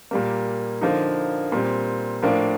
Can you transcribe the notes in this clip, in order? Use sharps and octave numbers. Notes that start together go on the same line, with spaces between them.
A#2 G3 A#3
D3 F3 A#3 D#4
A#2 G3 C4
A2 F3 A#3 D4